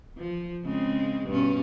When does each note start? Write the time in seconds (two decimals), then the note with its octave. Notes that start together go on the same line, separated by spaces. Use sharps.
0.18 F3
0.64 C#3 G#3 C4
1.27 G2 B2 C#4